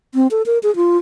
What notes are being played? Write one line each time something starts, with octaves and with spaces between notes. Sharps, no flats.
C4
A4
A#4
G#4
F4